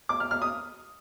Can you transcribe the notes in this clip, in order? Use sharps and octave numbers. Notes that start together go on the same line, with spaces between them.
D6
F6
F6
D#6